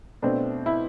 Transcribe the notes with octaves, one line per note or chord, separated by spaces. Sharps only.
B2 A3 C4 D4
E4